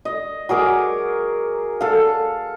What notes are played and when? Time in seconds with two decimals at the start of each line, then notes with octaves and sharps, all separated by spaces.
0.05 D#5
0.49 F#3 G#4 A#4 D6
1.81 A4 F5